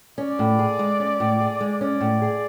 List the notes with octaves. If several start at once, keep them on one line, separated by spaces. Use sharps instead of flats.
C#4 D5
A2
G#4
G#3
C#4
A2
G#4
G#3
C#4 D5
A2
G#4